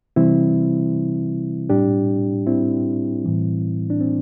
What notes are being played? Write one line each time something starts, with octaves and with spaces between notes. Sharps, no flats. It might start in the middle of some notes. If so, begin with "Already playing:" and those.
C3 E3 G3 C4 E4
A2 G3 D4 G4
C4 E4
A2 E3 G3
D4
C4